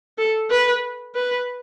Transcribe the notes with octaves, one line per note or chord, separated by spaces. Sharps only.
A4
B4
B4